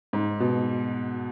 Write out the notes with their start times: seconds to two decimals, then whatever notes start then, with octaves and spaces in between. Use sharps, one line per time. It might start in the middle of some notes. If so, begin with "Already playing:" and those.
0.13 G#2
0.40 B2